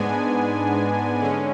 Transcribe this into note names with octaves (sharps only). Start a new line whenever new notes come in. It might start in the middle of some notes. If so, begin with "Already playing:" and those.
Already playing: G#2 G#3 B3 D4 G#5
D3 G#3 C#4